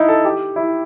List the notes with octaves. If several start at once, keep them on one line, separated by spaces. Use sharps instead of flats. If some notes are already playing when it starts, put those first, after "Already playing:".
Already playing: D#4 E4
A4
G4
E4